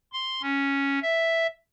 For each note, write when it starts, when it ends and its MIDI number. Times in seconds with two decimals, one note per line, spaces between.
0.13 0.42 84
0.42 0.99 61
1.03 1.47 76